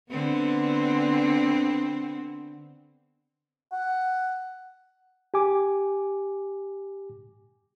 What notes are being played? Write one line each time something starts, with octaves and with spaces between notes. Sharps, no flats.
D3 B3 C4
F#5
G4 G#5 D6